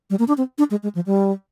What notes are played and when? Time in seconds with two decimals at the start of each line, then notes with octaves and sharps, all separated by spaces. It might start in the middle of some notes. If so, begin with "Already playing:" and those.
0.10 G3
0.19 A#3
0.28 D4
0.38 C4
0.58 D4
0.71 G#3
0.83 G#3
0.95 F3
1.06 G3